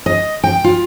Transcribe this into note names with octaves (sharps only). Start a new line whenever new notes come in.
D#5
G5
F4